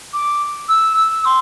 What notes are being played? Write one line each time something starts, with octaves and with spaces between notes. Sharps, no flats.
D6
E6
E6
C6